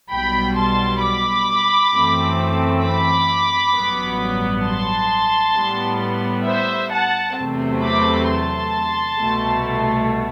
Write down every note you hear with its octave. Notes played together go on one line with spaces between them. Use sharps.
B1 B2 G3 G5 B5
A5 C6
B5 D6
F#2 E3 A3 C4
B5 D6
A1 G2 F#3 B3
A5 C6
A2 G3 B3
C5 E5
F#5 A5
E2 C3 F#3 A3 C4
B5 D6
A5 C6
C2 B2 A3